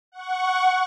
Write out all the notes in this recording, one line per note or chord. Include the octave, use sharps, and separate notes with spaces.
F#5 C#6